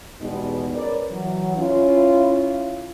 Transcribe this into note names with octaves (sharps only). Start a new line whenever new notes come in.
E2 B2 G3 G#3 B3 D#4
C#4 A#4 B4 D5
E3 F#3
C#4 E4 F4